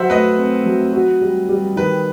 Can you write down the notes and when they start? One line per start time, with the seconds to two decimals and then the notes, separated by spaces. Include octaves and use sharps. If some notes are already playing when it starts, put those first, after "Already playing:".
Already playing: F#3 C5 E5 F#5
0.10 A3 B4 D#5
0.38 C4
0.66 F#3
0.93 F#4
1.21 G3
1.49 G3
1.76 D#3 B4